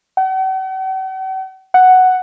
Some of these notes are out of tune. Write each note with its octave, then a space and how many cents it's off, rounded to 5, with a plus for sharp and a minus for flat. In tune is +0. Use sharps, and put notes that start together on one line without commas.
F#5 +45
F#5 +0